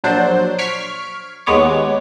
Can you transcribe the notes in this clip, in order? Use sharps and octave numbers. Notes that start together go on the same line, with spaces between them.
A#1 F#3 D4 C5 G6
C#6 F6 G#6 B6 C7 D7
D#2 G#3 B3 C#5 D6